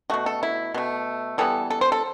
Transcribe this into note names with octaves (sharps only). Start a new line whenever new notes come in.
B2 A3 F#4
A4
E4
B2 A3
E3 G3 B3 A4
A4
C5
A4